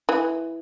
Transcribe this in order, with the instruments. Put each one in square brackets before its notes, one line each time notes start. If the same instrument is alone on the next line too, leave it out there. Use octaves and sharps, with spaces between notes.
[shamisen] E3